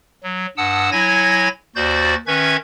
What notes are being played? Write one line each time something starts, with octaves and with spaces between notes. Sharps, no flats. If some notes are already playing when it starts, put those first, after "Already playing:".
F#3
G2 F#5 A5 D#6 E6
F#3 E4 C#5 G#5 G#6 A#6
D#2 F#4 C5 D5 G6 A6
D#3 C#4 B4 E5 C#6 G#6